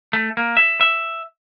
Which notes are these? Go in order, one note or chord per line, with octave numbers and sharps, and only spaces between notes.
A3
A#3
E5
E5